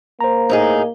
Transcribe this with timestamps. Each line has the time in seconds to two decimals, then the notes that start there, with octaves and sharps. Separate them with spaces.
0.21 A#3 C5 A#5
0.50 A2 D#4 G#4